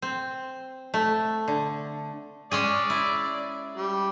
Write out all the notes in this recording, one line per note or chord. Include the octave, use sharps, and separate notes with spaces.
C4
A3
D3
G#3 C#4 G#4 D5
E4
G3